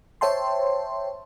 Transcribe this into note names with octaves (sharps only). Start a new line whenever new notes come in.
C5 C#5 E5 G5 A5 C6